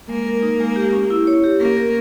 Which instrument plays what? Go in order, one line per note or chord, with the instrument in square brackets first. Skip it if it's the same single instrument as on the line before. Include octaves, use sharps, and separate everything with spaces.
[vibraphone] G#3 [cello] A#3
[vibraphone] A#4
D#4
G#3
G4
C#4
E4
C#5
G4
[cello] A#3 [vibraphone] C#4
[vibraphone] A#4